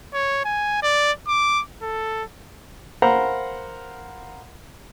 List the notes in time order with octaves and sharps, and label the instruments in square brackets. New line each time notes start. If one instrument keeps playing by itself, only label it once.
[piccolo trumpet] C#5
G#5
D5
D6
A4
[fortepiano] A#4 C5 F5 F#5 A#5 B5